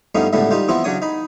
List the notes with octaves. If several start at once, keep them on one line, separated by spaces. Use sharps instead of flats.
G2 F3 A3 B3 C#4 D#4
C#2 A2 D3 G3 A3 B3
G3 D#4 F4 G4
E3 F3 B3 C4 E4 F4
C#3 F#3 D4 C#5 D#6
D#4 B5